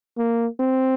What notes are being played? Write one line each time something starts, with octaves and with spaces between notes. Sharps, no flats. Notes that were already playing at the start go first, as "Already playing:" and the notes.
A#3
C4